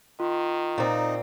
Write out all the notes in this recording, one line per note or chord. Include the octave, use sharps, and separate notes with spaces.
D#3 F4
A#2 C4 D#4